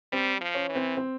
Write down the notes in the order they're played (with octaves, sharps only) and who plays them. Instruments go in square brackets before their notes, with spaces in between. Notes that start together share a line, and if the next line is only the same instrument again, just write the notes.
[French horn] G3 [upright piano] C4
[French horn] F3
[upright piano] C#4
[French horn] E3
[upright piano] C4
C4